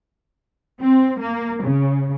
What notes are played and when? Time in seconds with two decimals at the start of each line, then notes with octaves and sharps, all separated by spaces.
0.80 C4
1.19 A#3
1.63 C#3